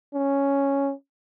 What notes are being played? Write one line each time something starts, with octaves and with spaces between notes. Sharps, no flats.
C#4